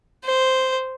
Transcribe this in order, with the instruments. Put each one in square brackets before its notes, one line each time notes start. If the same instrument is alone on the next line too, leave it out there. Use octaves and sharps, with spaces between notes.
[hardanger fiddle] C5